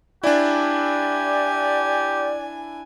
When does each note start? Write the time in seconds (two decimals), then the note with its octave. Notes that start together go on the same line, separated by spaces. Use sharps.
0.23 D4 E4 G4 D5 G#5